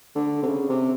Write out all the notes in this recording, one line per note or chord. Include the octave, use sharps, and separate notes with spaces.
D3
C3
C#3
C3